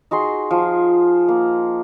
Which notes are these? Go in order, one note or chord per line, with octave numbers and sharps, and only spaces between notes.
D#4 F#4 G#4 C6
F3
A#3